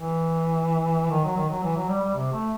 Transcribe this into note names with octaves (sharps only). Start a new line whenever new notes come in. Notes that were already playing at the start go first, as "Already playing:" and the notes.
Already playing: E3
D#3
F#3
D#3
F#3
E3
F#3
G3
G3
C3
A3